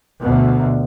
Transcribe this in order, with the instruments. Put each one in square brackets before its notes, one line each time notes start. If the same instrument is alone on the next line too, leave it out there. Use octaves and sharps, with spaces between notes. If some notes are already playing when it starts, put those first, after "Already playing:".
[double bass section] D2 B2